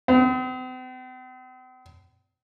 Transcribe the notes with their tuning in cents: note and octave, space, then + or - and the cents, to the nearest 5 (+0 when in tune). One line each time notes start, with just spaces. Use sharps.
C4 -45